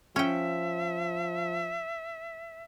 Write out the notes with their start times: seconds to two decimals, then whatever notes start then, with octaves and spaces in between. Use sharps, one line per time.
0.16 F3 C#4 E5 G5